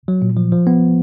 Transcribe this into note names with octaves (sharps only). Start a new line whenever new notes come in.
F#3
A#2
F3
F3
B3